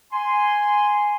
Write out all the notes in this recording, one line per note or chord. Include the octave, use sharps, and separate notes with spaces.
G#5 C6